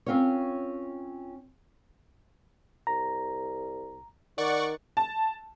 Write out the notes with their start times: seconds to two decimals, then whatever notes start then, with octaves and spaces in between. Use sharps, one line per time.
0.06 C4 C#4 F4 A#4 C#5
2.87 C2 A#5
4.38 D#3 D5 F#5 C#6
4.97 A5